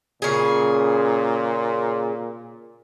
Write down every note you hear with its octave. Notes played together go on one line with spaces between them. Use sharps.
A#2 C#3 G#4